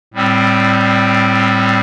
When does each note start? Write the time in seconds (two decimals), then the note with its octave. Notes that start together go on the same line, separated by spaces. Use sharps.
0.14 A2 G3 C4